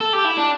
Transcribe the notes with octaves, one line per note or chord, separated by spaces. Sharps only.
A4
G4
E4
D4